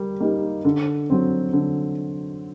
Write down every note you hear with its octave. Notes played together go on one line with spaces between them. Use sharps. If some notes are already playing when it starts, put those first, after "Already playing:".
Already playing: G3 A#3
A#3 D#4 G4
D3
F#3 C4
D3